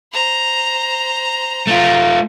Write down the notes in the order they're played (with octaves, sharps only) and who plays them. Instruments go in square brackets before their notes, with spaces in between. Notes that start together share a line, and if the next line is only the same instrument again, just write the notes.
[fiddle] C5 A#5
[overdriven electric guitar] A3 F4